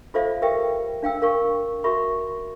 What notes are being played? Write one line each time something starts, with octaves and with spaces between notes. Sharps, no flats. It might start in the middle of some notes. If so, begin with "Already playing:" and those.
F4 A4 C5 D5 E5 F5
G4 A#4 B4 E5 F5 G5
D4 F5 G5 E6
A#4 F5 C#6
F#4 A#4 E5 B5 C#6